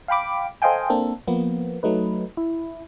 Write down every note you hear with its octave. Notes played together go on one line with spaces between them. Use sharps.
F5 G5 B5 D6
A4 C5 D#5 F5 G5 G#5
A#3 C4 D4 A4
F3 A#3 B3
F#3 A3 D#4 B4
E4